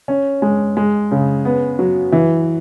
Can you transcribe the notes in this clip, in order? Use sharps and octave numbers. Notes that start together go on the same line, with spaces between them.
C#4
G#3
G#3
C#3
B3
F#3
E3